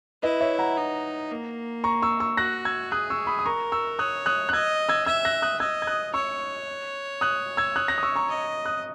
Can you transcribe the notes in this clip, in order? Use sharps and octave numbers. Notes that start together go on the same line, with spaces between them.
E4 B4 D#5
C#5 E5
F#5 A#5
D#4
A#3
A#5 C#6
C#6 E6
C#6 E6
F#4 F#6 A#6
E6 G#6
G#4 D#6 F#6
C#6 E6
B5 D#6
D#6
A#4 A#5 C#6
C#6 E6
C#5 D#6 F#6
D#6 F#6
F#6
D#5 E6 G#6
E6 G#6
E5 E6 G#6
F#6 A#6
D#6 F#6
D#5 E6 G#6
G#6
D#6 F#6
C#5 C#6 E6
D#6 F#6
E6 G#6
D#6 F#6
F#6 A#6
D#6
C#6 E6
A#5 C#6
D#5
D#6 F#6